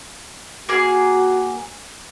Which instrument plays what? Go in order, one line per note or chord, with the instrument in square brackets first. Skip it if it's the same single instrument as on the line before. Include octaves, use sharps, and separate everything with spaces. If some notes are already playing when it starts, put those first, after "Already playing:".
[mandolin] A#3 G#4 [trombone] F#4